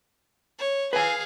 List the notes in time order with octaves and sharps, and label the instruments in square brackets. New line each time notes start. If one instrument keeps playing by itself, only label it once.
[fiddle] C#5
[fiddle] G#4 F5 [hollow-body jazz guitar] B4 G#5